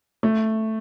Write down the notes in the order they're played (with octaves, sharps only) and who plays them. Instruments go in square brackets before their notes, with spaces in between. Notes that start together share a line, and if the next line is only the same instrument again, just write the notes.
[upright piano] A3